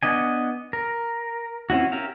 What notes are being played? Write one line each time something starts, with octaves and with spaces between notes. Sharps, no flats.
B3 D4 D#5 G#5
A#4
C4 C#4 E4 F#4
C#4 G4 A#4 E5 F5